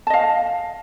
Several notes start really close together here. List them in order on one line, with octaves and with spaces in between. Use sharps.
A5 D#5 F5